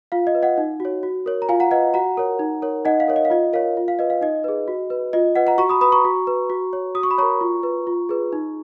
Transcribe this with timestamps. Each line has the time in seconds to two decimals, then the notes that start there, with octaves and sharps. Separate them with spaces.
0.12 F4 F5
0.27 D#5
0.35 B4
0.43 D#5 F#5
0.58 D#4
0.80 F#4 C#5
1.03 F#4
1.26 A#4 C#5
1.42 A#5
1.49 F4 F5 G#5
1.60 F#5 A#5
1.71 B4 D#5 F#5
1.94 F#4 F#5 A#5
2.17 A#4 C#5
2.39 D#4
2.62 A#4 C#5
2.85 D#4 D#5 F#5
3.00 F5
3.08 A#4 C#5
3.16 D#5
3.25 F5
3.30 F4 D#5
3.53 A#4 C#5 F5
3.77 F4
3.88 F5
3.99 B4 D#5
4.10 F5
4.21 D#4 D#5
4.44 G#4 B4
4.68 F#4
4.90 B4
5.13 F4 D#5
5.35 B4 D#5 F#5
5.47 F#5 A#5
5.58 F#4 A#5 C#6
5.69 B5 D#6
5.81 B4 B5 D#6
5.92 A#5 C#6
6.05 F#4
6.27 B4
6.50 F#4
6.73 C#5
6.95 F#4 D#6
7.03 C#6
7.11 B5
7.18 A#4 C#5 A#5 C#6
7.41 F4
7.63 B4
7.87 F4
8.09 G#4 B4
8.33 D#4